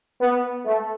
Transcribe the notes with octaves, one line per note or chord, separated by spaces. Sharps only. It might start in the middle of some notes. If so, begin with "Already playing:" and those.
B3
A3